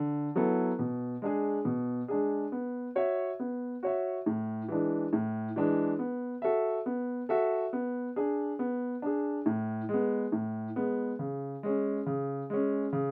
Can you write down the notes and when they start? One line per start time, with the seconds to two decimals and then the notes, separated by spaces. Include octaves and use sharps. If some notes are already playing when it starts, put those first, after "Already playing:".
Already playing: D3
0.35 F#3 B3 E4 A4
0.79 B2
1.22 G#3 D4 G#4
1.65 B2
2.08 G#3 D4 G#4
2.52 B3
2.95 F#4 C#5 E5
3.40 B3
3.83 F#4 C#5 E5
4.26 A2
4.68 E3 G#3 D4
5.13 A2
5.56 E3 G#3 D4
5.99 B3
6.42 F#4 A4 E5
6.86 B3
7.29 F#4 A4 E5
7.73 B3
8.16 D4 G#4
8.59 B3
9.02 D4 G#4
9.46 A2
9.89 G#3 B3
10.32 A2
10.76 G#3 B3
11.19 C#3
11.63 G#3 C#4
12.06 C#3
12.50 G#3 C#4
12.93 C#3